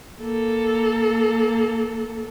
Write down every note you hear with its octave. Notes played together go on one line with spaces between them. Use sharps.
A#3 A4